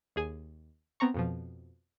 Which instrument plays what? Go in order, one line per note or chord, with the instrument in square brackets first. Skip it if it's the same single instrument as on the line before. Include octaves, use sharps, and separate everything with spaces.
[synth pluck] D#2 G#4 G#5
B3 C4 A#5 C#6
F2 B2 F3